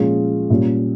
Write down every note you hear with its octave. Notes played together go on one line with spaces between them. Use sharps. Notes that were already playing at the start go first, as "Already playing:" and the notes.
Already playing: A#2 F3 G#3 C#4 F4
A#2 G3 C#4